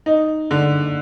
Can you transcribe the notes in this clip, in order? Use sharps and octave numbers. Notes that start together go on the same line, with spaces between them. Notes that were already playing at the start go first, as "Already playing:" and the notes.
D#4
D3